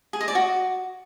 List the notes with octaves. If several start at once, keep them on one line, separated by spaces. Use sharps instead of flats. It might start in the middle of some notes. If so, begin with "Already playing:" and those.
G#4
D#5
D5
F#4